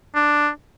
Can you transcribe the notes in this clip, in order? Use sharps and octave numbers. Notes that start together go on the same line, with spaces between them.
D4